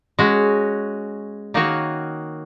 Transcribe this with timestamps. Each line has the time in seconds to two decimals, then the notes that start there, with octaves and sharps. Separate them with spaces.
0.19 G#3 C#4 F#4
1.54 D#3 A#3 D#4 F#4 C#5